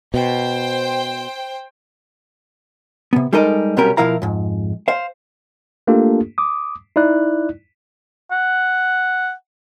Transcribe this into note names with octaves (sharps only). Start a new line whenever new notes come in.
B2 C5 G5
C3 B3
G3 G#3 D#4 A4 A#4 D#5
B1 C3 F#3 G3 C#4 A#4
B2 F3 E4 A#4 F5 A#5
F2 G#2
C5 F5
A3 A#3 D4 F4 G4 A4
D6 D#6
D#4 E4 D5 F#6
F#5